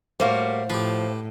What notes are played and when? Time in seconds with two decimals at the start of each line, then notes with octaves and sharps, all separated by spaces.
0.20 A2 G3 A#3 F#4 C5 F5
0.70 A2 F3 G4 B4